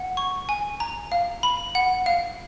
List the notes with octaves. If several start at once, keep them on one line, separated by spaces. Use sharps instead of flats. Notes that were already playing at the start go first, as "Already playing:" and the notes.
Already playing: F#5
C#6
G#5
A#5
F5
B5
F#5
F5